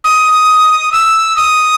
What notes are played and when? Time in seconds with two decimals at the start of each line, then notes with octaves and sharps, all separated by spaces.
0.04 D#6
0.92 E6
1.36 D#6